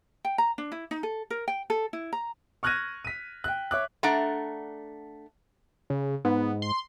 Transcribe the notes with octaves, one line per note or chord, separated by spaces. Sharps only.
G5
A#5
D4
E4
D#4
A4
A#4
G5
A4
E4
A#5
C#6 F6 F#6 G#6 A#6 D#7
B6 D#7
G5 F#6
C#5 E5 D6 F#6
A3 D4 F#5 A#5
C#3
G#2 B3
C6